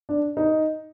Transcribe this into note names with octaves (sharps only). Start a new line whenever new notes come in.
D4
D#4